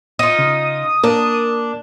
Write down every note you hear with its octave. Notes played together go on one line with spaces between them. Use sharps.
D#4 F4 D#6
C#3
A#3 D4 A#4